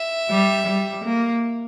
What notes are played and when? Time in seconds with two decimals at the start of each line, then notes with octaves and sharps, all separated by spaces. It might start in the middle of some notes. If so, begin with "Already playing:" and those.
Already playing: E5
0.30 G3
0.67 G3
1.05 A#3